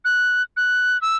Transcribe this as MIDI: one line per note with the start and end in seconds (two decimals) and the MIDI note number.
0.05 0.42 90
0.57 1.00 90
1.02 1.17 88